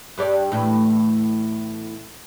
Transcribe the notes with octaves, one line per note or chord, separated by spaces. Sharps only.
G2 G4 D5
E2 A2